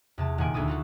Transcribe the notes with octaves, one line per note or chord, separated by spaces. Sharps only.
E2 C3 A5
D#1 F#5 G#5 D7
D2 G#4 A4 D#6
F4 F#4 A4